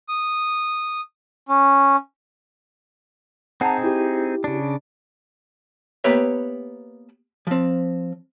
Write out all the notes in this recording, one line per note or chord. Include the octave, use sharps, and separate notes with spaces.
D#6
C#4
C4 D#4 G#4 F#5 A5 A#5
E4 G4
C#3 D4
A#3 B3 G4 B4 C#5 E5
F3 C4